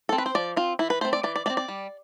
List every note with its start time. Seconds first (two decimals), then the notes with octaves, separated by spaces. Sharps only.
0.09 C4 A4
0.18 B4
0.26 C5
0.35 F3 D5
0.56 C4 F4
0.79 E3 E4
0.90 B4
1.01 A3 C4 C5
1.13 D5
1.23 E3 D5
1.36 D5
1.46 A3 D5
1.50 C4
1.57 D5
1.68 G3